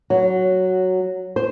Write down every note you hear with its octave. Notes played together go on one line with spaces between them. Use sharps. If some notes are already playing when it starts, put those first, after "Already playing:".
F#3
C5